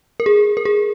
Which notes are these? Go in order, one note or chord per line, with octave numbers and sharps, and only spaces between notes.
A#4
G#4
A#4
G#4